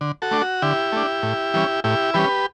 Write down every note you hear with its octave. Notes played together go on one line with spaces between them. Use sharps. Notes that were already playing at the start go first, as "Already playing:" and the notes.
D3
F#4 A4
A3 D4
F#4
D3 E4 G4
A3 D4
A2
E3 G3 C#4
A2 E4 G4
E3 G3 C#4 G4 B4